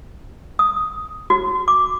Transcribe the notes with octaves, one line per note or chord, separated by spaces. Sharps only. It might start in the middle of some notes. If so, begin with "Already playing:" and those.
D#6
F#4
D6